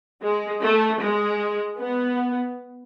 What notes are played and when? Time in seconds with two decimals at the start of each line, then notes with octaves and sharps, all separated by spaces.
0.22 G#3
0.61 A3
1.01 G#3
1.79 B3